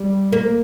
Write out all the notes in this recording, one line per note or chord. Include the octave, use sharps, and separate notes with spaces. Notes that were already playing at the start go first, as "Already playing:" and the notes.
Already playing: G3
A#3